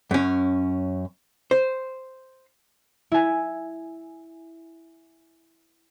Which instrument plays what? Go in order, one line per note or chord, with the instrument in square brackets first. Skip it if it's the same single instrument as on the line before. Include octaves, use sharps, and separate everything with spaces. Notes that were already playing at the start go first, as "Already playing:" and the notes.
[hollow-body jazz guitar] F#2 C#4
C5
[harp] E4 G#5